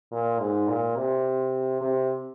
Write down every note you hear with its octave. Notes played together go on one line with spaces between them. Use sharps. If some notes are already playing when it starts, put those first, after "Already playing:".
A#2
G#2
A#2
C3
C3